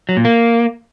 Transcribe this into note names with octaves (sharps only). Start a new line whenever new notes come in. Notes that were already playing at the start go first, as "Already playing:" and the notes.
F#3
A#2
A#3